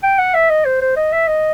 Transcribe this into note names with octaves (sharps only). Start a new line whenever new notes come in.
G5
F#5
E5
D#5
C5
C5
D#5
E5
D#5